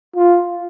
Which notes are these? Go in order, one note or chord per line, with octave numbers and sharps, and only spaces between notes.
F4